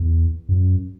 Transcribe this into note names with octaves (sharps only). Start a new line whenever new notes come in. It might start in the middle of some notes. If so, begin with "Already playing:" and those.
Already playing: E2
F#2